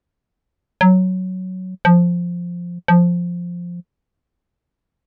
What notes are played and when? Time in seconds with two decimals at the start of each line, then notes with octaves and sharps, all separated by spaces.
0.81 F#3
1.85 F3
2.88 F3